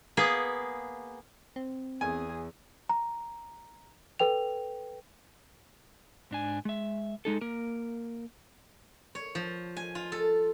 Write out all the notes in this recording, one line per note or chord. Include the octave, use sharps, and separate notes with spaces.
A#3 B3 G#4
C4
E2 G#4 G#5
A#5
A4 B4 G5 F7
G#2 D4 G#5
G#3 E5
G#3 D#4 A4
A#3 A#4
C#5
F3
G#5
F4
A4